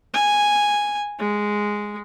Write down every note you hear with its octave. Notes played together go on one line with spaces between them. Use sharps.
G#5
G#3